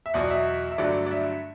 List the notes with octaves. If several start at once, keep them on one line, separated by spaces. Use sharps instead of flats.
E5
E2 B2 F#3 D5
E5
E5
G2 D3 F#3 A3 D5
D5
E5